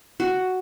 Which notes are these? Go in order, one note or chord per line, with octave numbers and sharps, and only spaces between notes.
F#4